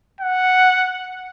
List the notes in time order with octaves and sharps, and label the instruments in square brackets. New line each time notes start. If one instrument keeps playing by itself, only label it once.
[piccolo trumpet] F#5